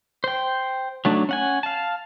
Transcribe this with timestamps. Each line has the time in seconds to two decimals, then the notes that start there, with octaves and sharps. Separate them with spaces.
0.24 C5 G5
1.05 F#3 A3 D4 D#4
1.29 C#4 F#5 G#5
1.63 F5 A5